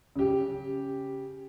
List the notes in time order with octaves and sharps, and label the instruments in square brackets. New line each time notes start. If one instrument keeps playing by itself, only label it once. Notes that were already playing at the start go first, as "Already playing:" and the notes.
[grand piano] C#3 G4